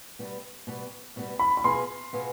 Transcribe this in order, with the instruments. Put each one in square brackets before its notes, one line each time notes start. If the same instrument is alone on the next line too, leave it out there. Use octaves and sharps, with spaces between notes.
[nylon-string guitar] B2 G3 B3
B2 G3 B3
B2 G3 B3
[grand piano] B5
B5
[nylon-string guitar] B2 B3 F4 G#4 [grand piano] C6
[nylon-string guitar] B2 B3 F4 G#4